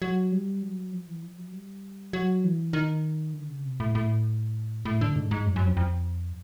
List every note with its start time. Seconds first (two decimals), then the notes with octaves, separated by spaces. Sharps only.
0.02 F#3
0.32 G3
0.62 F#3
0.92 F3
1.08 E3
1.23 F3
1.38 F#3
1.52 G3
2.13 F#3
2.44 E3
2.73 D#3
3.34 D3
3.49 C#3
3.65 C3
3.80 A2
3.95 A2
4.85 A2
5.01 D3
5.16 G#2
5.31 G#2
5.46 F#2
5.56 F#2
5.67 F2
5.77 F2